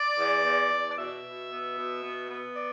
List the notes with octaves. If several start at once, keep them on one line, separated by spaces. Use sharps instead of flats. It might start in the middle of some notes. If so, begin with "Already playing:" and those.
Already playing: D5
E2
E2
E2
D5
B2 E5
B2
B3
B2
B3
B3
D5